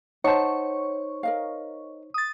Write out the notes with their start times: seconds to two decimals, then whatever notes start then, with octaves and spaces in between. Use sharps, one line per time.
0.24 D#4 C5 C#5 F#5 A5 C#6
1.23 A#4 D#5 F5
2.14 D#6 A6